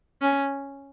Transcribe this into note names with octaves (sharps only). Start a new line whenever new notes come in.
C#4